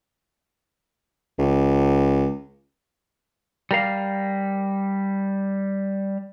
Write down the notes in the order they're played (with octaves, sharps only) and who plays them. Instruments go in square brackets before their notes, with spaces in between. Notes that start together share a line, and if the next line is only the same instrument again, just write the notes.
[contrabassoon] C#2
[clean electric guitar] G3 A#4 F5